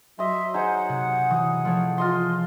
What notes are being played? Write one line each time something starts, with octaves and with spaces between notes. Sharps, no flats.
F#3 D#5 E5 C6
D#4 G#4 C5 F#5
C3
E3 D#6
F3 A3 C#5
F4 D#5 C6